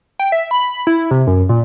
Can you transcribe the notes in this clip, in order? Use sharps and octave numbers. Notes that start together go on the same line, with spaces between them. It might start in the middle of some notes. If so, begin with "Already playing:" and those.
G5
E5
B5
E4
C3
F#2
A#2